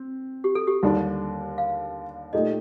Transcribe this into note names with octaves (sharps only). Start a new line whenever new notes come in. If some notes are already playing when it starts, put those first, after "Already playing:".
Already playing: C4
G4
A4
G4
D#2 D3 G3 D4
F5
A#2 A3 D#4 G4 D#5